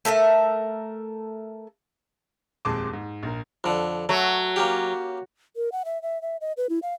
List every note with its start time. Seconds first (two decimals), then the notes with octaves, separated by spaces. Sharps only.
0.05 A3 A4 A#4 E5
2.65 D#1 F2 G#3 A5 C6 D6
2.93 G#2
3.23 A#1 A#4
3.64 F2 D3
4.09 F#3 A3
4.56 A#3 C#4 G4
5.56 A#4
5.72 F#5
5.85 E5
6.02 E5
6.22 E5
6.41 D#5
6.57 B4
6.70 E4
6.82 F5